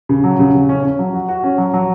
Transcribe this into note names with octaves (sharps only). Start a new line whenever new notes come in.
C#3
F#3
C#3
C#3
C#4
C#4
F#3
F#4
F#4
C#4
F#3
F#3